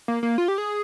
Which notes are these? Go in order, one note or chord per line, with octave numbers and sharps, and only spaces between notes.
A#3
A#3
F4
G4
G#4